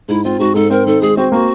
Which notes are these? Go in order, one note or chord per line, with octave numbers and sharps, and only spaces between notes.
G#2 E4
C4 F4
G#2 F#4
G#2 A4
C4 A#4
D#3 A4
G#3 G#4
C4 F#4
A#3 F#4